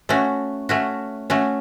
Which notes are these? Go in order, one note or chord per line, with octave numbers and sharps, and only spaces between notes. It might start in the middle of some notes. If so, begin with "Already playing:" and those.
A3 C#4 F#4
A3 C#4 F#4
A3 C#4 F#4